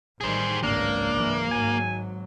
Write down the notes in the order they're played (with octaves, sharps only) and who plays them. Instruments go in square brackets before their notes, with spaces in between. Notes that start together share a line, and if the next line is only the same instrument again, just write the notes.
[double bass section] A1 D#3 G3 [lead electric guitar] G#4 C5
[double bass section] G#1 C#2 [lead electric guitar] A#3 [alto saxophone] D4
[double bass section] F#1 G#2 E3
[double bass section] G#1 G#2 F#3 [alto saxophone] G#5